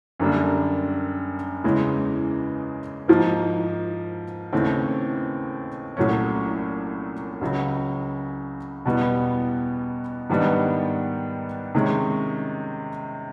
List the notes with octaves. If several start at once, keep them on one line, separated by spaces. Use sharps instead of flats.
F#2 D3 G3 A#3 D4
E2 C#3 E3 G#3
G#2 F3 A#3
D#2 C#3 E3 A3 C4
C2 A#2 F#3 A3 C#4
C#2 C#3 F#3
E2 B2 G3 B3
G#2 D#3 G3 B3 D4
C3 D#3 G#3 C#4